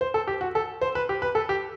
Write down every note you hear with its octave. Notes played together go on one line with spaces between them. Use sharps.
C5
A4
G4
F#4
A4
C5
B4
G4
B4
A4
G4